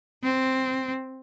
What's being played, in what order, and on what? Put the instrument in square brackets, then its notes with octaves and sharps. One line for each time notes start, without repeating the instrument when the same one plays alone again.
[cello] C4